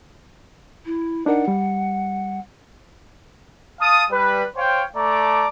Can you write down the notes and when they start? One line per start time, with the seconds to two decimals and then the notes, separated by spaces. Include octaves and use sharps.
0.85 E4
1.26 D4 D#4 A#4 F#5
1.48 G3
3.81 F5 A5 D#6
4.11 G3 B4
4.57 C5 C#5 F5 G5
4.96 A3 D5 A5 A#5 D6